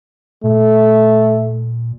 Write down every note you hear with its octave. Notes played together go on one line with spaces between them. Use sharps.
A#2 A3